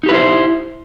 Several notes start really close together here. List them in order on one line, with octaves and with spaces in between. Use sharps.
D#4 G4 B4 E4 C5